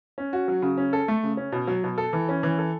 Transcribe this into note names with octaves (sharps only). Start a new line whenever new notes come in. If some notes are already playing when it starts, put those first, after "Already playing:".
C#4
F#4
F#3
C#3
C#4
A4
A3
C#3
C#4
B2
F#3
B2
A4
E3
C#4
E3
A4